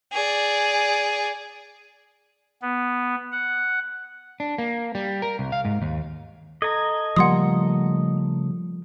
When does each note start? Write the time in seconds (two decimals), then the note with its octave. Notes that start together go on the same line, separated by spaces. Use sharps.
0.13 G#4 D5
2.62 B3
3.32 F#5
4.40 D4
4.58 A#3
4.95 G3
5.22 A#4
5.39 C2
5.52 F5
5.65 G#2
5.82 D#2
6.62 A4 D#5 A#5 G#6
7.16 C#3 F3 G3 A3 A#3 F#5 C6 D#6